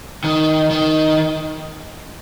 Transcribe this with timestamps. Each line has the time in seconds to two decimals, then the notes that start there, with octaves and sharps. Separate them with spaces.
0.24 D#3
0.70 D#3